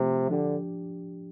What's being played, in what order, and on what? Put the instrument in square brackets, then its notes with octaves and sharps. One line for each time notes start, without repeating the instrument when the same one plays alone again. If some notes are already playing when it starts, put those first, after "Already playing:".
Already playing: [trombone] C3 [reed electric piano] F3 A3 F4 C5
[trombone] D3 [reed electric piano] F3 D4 G4